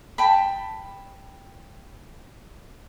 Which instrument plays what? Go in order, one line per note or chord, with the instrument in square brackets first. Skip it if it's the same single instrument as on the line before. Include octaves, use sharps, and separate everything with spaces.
[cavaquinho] G5 A5 B5